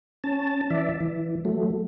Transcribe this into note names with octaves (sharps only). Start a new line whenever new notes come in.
C#4 A5
E3 D5 E5
E3
F#3 A3